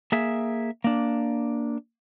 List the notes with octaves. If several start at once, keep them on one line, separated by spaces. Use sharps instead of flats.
A#3 G#4 E5
A#3 D4